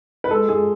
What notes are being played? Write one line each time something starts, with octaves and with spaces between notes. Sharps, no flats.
B4
G#3 A4
G#3 G#4